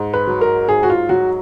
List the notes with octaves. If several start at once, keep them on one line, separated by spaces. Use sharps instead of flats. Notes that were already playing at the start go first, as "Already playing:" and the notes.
Already playing: G#2
B4
F#3
A#4
G#2 G#4
F#4
F4
F#3 F#4